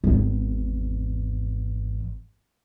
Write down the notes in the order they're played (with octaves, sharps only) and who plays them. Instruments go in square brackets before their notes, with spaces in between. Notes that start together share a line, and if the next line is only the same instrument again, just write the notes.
[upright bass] G#1 E2